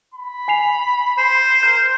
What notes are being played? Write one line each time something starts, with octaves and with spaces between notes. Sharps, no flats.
B5
G#5 C7 F7
C5
A#4 G6